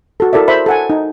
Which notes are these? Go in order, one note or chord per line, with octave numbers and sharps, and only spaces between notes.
F#4 A4
E4 A4 A#4 D5 E5
C5 E5 B5
A4 F#5 G#5
D#4